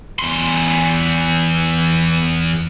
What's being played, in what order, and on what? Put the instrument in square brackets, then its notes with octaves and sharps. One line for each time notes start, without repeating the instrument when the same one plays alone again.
[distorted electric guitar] E2 C6